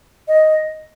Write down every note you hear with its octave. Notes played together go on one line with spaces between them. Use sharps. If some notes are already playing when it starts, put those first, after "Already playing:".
D#5